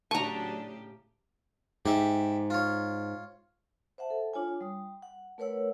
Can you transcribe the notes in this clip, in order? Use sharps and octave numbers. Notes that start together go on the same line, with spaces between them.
A2 C#3 F#3 D4 G4 A5 A#5 C#6
G#2 G4 E5
F4 C#5
C5 E5 F#5 A5
A4
D4 F4 C#5 G#5
G3 D#6
F#5
A3 A#4 B4 C#5 F#5 E6